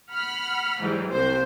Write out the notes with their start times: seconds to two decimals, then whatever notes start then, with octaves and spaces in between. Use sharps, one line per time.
0.11 F#5 B5 F6
0.80 G#2 E3 F#3 G3
1.11 C2 C5